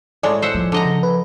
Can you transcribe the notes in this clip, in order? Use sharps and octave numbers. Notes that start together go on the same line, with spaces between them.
A2 G#3 D5 G#5
C5 E5 F#5
F3
D3 D#5 A#5
C#3
B4